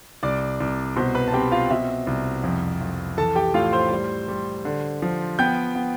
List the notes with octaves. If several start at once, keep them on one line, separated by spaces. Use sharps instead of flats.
C2 D5 D6
C2
B2 C5 C6
B4 B5
A5
C4 G4 G5
F4 F5
B2 E5
C2
F2
F2
E3 A4 A5
G4 G5
A2 F4 F5
C5 C6
G3
G3
D3
F3
B3 G5 G6
B3